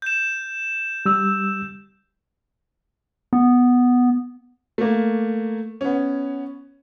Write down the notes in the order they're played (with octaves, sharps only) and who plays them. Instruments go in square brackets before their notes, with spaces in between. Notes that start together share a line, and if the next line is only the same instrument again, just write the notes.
[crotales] G6 E7
[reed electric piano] G3 E6
[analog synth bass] B3
[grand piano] A3 A#3
B3 C#4